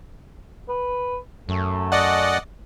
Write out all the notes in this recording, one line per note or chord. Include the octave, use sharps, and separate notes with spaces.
B4
F#2 A3
D5 D#5 F#5